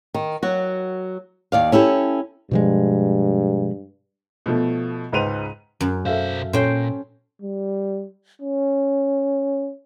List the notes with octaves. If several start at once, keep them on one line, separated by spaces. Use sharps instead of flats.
D#3
F#3 F#4
D#2 D5 F5
C#4 E4 G4 A4
G2 B2 F3 G#3
B2 F3 A3
C#2 G#2 B4 C5 D#7 F7
F#2
B1 A4 C5 E5 F5
A#2 C#4 A4 C5 C#5 G5
G3
C#4